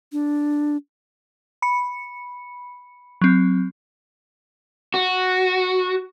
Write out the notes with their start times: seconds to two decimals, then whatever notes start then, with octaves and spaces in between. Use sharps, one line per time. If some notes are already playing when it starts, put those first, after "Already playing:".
0.13 D4
1.62 B5 C#7
3.21 F#3 C4
4.94 F#4